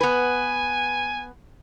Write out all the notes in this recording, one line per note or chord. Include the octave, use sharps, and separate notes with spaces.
B3 B4 G#5